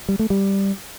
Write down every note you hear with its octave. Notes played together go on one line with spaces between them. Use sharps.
G3
A3
G3